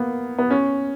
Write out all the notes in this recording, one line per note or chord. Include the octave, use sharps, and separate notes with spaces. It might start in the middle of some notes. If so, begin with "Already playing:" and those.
Already playing: A#3 B3
B3
C#4